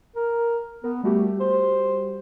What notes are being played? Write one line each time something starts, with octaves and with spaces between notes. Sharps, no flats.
A#4
B3 A#4
G3 A3 F#4 G4
C5